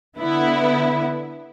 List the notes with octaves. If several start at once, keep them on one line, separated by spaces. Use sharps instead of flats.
D3 B3 E4